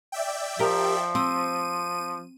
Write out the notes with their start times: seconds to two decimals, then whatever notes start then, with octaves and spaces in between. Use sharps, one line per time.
0.12 D5 E5 G5
0.59 F3 G4 A#4
1.15 C4 D#7